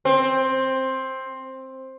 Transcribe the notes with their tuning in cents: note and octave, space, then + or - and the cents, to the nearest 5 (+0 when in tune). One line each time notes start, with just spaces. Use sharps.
C4 +10